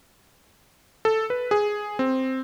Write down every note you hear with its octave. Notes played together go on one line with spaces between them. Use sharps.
A4
B4
G#4
C4